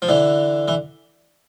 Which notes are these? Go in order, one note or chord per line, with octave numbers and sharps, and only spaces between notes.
F3
D3 E3
E3